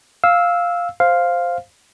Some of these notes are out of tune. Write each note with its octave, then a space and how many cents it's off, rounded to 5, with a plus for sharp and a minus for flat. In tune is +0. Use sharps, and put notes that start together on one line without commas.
F5 +0 E6 -10
C5 +0 F5 +0